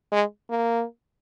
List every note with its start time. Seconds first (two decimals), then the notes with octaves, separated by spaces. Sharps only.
0.12 G#3
0.50 A#3